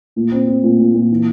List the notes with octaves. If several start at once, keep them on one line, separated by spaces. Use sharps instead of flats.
A#2
C4
C4
A#2
A#2
A#2
E3